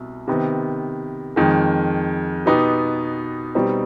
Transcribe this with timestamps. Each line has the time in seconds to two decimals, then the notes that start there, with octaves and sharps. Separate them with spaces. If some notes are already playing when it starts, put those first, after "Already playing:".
Already playing: C2 B2
0.28 C3 D#3 B3
1.36 F2 D#3 G#3
2.46 B2 B3 D#4 G4
3.55 B2 G3 C4 D#4